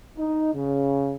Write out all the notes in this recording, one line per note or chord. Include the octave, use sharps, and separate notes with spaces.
D#4
C#3